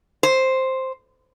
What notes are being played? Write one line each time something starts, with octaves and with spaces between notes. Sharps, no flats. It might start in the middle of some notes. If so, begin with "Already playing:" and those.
C5